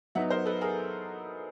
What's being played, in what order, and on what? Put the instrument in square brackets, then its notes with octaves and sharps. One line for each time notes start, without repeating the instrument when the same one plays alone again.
[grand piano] F#3 B3 D#4 [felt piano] E5 F#5
[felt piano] A#4 C5
A4 B4
G#4 A#4